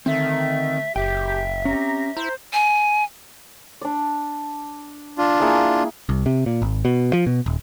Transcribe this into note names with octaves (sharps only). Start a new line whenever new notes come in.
D3 D#3 A3 C4 A4 E5
F#1 G4 E5 G5
C4 C#4 G4 A#5
E4 C5 A#5
G#5
D4 D5
D4 F4
A#3 E4 G#4
C2
C3
A#2
G#1
B2
F3
B2
D#1